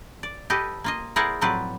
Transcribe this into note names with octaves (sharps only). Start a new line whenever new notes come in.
D5
G4 A4 B4 D#5
A#3 F4 D#5
E4 G#4 A#4 C5 D5 F#5
A2 F3 F#3 C4 B4 D5